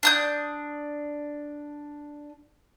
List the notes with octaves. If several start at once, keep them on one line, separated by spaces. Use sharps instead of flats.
D4 D#6 G6